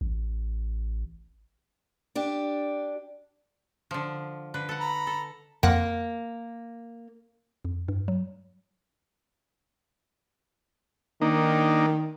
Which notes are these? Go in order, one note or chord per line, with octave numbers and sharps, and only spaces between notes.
A1
D4 G4
D3 F3
D3 B4
A4 F#5
A#5 B5
A4
F2 A#3 F#5
F2
G2
F#3
D#3 A#3 D4 D#4